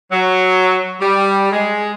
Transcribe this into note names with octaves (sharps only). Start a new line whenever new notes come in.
F#3
G3
G#3